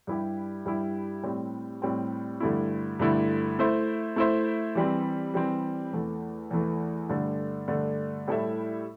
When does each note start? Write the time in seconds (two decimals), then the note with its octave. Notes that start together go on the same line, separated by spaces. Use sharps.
0.07 G2 G3 E4 G4
0.65 G2 G3 E4 G4
1.23 A2 G3 C4
1.82 A2 G3 C4
2.40 G2 D3 A3 E4
2.99 G2 D3 A3 E4
3.59 A3 E4 C5 E5
4.16 A3 E4 C5 E5
4.75 E3 G3 C4
5.34 E3 G3 C4
5.92 E2 E3 A3
6.51 E2 E3 A3
7.09 G2 D3 A3 D4
7.68 G2 D3 A3 D4
8.27 A2 G3 E4 A4 E5